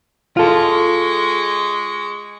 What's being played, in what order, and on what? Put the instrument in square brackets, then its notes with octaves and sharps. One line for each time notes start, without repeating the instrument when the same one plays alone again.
[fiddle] G#3 C#6 [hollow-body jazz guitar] F4 A4